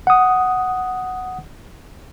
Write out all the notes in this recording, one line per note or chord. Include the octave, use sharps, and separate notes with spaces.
F#5 D#6